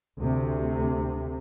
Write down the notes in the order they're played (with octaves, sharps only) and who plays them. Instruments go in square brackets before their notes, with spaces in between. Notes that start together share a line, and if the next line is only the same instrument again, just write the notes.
[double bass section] D2 C3